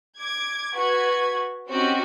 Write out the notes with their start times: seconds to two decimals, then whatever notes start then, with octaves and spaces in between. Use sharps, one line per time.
0.18 D6 G#6
0.75 F#4 B4 G#6
1.69 C4 C#4 D#4 F#4 G4